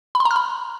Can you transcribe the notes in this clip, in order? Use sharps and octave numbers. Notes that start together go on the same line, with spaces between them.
B5
C6
A#5
F6
B5